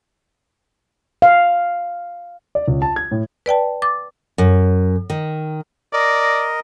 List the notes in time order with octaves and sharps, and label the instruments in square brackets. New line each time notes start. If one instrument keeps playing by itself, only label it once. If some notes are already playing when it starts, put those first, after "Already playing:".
[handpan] F5
[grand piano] D5
C#2
A5
G#6
A2
[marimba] B4 D5 G5 A5
D6 A6
[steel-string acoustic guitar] F#2
D#3
[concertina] A#4 D#5 [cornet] D5